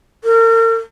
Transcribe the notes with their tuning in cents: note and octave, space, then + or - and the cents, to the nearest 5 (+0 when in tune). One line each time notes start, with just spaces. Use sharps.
A#4 -40